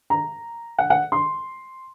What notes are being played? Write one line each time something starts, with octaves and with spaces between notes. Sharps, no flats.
A#5
F#5
F#5
C6